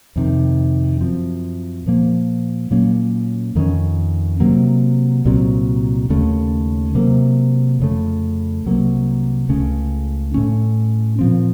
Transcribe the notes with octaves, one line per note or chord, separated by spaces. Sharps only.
F2 C3 D#3
F#2 F3 C4
A#2 F3 A#3
A#2 F#3 A#3 C#4
F2 D#3 A#3 C#4
C3 F#3 A#3
C2 A#2 F#3 C4
D#2 C#3 A3 C#4
C3 F#3 A#3
F2 C#3 A3
C2 C3 F#3 A#3
C#2 C#3 A3 C#4
A2 A3 C#4
A#2 F3 C4